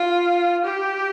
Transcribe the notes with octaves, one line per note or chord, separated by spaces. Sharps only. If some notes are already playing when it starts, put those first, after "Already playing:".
Already playing: F4
G4